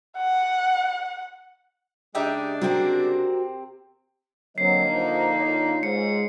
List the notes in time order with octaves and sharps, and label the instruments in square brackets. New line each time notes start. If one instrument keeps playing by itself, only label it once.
[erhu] F#5
[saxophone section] C#3 G#3 D4 [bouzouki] D#4 G4 E5
[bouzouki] C3 C4 [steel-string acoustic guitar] F#4 A#4
[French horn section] D3 A#3 D#5 [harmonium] F#3 [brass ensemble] C4 A#4 [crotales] C7
[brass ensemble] F3 [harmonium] D#4
[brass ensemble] F4 C#5
[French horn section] G#2 G#3 [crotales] C#7